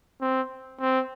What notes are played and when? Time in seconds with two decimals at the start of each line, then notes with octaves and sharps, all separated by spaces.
0.21 C4
0.80 C4